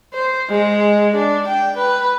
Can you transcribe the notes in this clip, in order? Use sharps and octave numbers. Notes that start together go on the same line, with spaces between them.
C5
G#3
D4
G5
B4